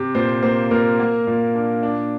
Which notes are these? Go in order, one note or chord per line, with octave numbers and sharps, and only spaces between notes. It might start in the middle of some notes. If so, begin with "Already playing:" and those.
Already playing: C3
A#2 C5
A#3 C5
A#2 A#4
A#3
A#2
D4
D4